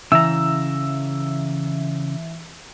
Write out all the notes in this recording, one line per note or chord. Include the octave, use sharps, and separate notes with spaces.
C#3 E3 A#5 E6